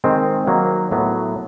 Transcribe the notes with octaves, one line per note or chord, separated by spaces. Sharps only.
D#3 G#3 C4
D#3 F#3 A#3
A2 F#3 B3